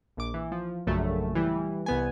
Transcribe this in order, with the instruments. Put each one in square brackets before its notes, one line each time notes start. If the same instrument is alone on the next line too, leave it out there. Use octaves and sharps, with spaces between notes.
[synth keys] A#1 D6
E3
F3
A#1 F#2 C#3 A3 A4
E3 G3
C2 B3 G#5